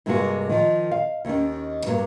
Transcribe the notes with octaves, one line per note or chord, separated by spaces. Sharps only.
G2 C3 F#3 G#3 A#3 F#4
D#3 F3
F5
D#2 D#3 C#4
G2 F#3 A#3